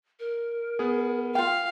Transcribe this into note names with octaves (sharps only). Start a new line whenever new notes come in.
A#4
B3 G#4
F4 F5 G5